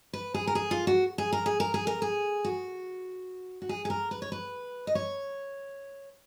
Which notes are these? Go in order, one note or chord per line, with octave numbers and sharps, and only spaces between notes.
B4
G#4
A#4
G#4
F4
F#4
G#4
A#4
G#4
A#4
G#4
A#4
G#4
F#4
F#4
G#4
G#4
A#4
B4
C#5
B4
D#5
C#5